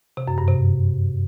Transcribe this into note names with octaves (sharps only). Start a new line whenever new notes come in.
C3
F#2
G2
C3